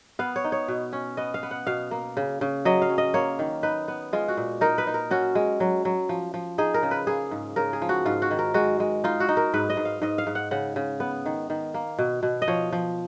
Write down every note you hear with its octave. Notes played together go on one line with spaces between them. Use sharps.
B3 F5
C#5
D#4
C#5
B2
C#4
B3 D#5
F5
B3
F#5
B2 F5
A#3
C#3
C#3
F#3 D#5
F5
C#4
D#5
A#3 C#5
D#3
D#4 B4
B3
G#3 F4
F#4
A#2
D#4 A#4
B4
D#4
A#4
C#4 F#4
G#3
F#3
F#3
F3
F3
D#4 G#4
A#4
C#3
B4
A#3 G#4
G#2
C#3 A#4
G#4
F3
F#4
G#2 F4
F#4
D#3
A#4
G#3 F#4
G#3
D#4 F4
F#4
D#4
A#4
G#2 B4
D#5
G#2
F5
G#2 D#5
F5
G#2
F#5
C#3 F#5
C#3
B3
D#3
D#3
A#3
B2
B2
D#5
F3 C#5
F3